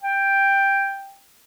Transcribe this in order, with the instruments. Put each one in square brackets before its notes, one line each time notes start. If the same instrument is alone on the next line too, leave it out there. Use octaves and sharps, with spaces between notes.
[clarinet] G5